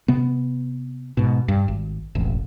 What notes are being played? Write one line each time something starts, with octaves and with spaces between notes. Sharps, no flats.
C3 B3
G#2 B2
G2
G#1
E1 A1